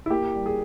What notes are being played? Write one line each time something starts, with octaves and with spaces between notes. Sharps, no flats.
E4
A#3 G4
G3
G#4